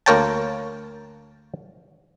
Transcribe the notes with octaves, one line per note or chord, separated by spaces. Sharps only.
D2 A#3 A#4 C#5 G5 A5